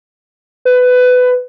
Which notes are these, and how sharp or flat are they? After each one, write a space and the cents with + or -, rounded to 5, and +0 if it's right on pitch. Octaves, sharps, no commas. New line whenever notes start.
B4 +20